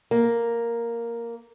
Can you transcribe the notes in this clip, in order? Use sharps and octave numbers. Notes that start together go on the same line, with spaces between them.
A#3